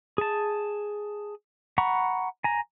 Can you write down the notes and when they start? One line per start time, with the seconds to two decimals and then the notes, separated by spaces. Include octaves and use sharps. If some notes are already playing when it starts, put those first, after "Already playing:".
0.18 G#4 A5
1.78 F#5 A#5 B5 C#6
2.44 G#5 A#5